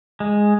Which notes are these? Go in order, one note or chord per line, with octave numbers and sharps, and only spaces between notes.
G#3